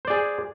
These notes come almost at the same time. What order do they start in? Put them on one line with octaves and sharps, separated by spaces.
C5 D5 G#4